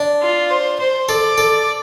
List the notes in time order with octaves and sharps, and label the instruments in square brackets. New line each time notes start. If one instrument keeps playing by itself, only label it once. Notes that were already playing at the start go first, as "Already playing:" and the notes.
Already playing: [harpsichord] D4
[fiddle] F4
C5
C5
[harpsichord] A4 [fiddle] D5
[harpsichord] A4